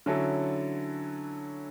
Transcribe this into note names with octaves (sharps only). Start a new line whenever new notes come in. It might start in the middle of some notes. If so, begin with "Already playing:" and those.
D3 F#3 C#4 E4 A4